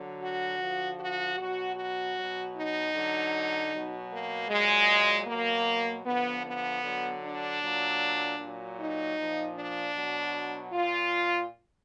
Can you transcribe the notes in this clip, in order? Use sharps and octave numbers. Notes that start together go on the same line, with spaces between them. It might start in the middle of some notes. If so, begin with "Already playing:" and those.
Already playing: D3 F#3
F#4
D3 F3
F#4
B2 F#3 F#4
F#4
B2 F#3
D#4
D3 F#3
B2 F#3
A#3
A#2 F#3 G#3
B2 F#3 A#3
D3 F3 B3
B3
D3 F#3
D4
A#2 F#3
A#2 F#3
D#4
A#2 F3
D4
B2 F#3
A#2 F4